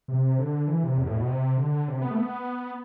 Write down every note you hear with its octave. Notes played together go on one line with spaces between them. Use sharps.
C3
D3
E3
C3
E2
A2
B2
C3
D3
C3
B3
A3
B3